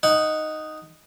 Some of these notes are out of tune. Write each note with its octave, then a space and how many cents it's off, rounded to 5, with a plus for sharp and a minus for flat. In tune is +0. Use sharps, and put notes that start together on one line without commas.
D#4 +0 F#5 +0